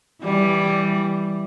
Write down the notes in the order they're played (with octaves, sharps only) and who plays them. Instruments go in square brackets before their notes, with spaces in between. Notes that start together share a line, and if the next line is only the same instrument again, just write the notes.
[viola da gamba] E3 G3